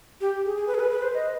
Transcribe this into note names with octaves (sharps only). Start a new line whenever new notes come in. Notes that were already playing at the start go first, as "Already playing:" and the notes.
G4
G#4
G#4
B4
G#4
B4
B4
C5
D#5